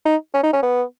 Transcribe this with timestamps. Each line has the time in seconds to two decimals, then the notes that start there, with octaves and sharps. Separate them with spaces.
0.06 D#4
0.34 C#4
0.43 D#4
0.53 C#4
0.62 B3